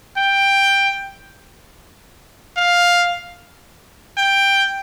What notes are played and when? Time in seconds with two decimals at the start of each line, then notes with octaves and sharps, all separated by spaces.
0.17 G5
2.57 F5
4.18 G5